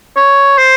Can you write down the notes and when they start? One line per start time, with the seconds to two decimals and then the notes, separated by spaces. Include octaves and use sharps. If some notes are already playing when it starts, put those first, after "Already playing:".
0.17 C#5
0.58 C5